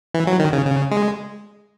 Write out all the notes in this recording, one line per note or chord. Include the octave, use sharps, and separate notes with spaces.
E3
F#3
D#3
C#3
C#3
G#3